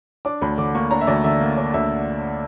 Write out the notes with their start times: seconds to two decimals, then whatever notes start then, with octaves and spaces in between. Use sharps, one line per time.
0.25 D4 D6
0.41 D2 B5
0.58 D3 D6
0.75 A#3 C#6
0.91 D4 A#5
1.01 E5
1.07 D2 D5
1.24 D3 E5
1.41 A#3
1.57 D4
1.74 D2 E5